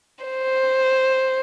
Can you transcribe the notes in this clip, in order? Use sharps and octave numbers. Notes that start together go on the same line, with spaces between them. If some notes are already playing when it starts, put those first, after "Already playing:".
C5